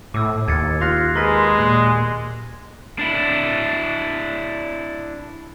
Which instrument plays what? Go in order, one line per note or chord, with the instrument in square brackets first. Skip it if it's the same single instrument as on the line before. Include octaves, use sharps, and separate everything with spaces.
[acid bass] A2 [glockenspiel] D6 E6
[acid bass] D#2 [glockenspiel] G#6 A6 C#7
[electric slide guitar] F4 [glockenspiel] F#6 A#6 C7
[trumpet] G#3 [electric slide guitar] A#4 B4 [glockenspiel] C6 A#6
[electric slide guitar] A#2 [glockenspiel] F#6
[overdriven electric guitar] D4 E4